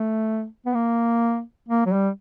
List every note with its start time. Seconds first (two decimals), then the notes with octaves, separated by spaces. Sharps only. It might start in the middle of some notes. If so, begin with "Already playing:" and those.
Already playing: A3
0.66 B3
0.74 A#3
1.68 A#3
1.86 F#3
1.92 G3